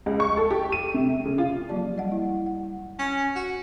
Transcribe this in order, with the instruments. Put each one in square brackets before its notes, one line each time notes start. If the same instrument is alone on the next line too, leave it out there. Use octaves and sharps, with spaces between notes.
[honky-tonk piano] C#2
C#6
A4
G4
D#7
C3
C#3
F4
[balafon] F3 F#3 A#3 G4 D5 A5
G3 D#5 F#5
E4
F#5
[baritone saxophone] C#4
F#4